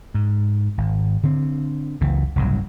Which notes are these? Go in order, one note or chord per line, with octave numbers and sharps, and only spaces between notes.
G#2
G#1
D3 C4
F#1 C#2 E3
F#1 C2 G#2 F#3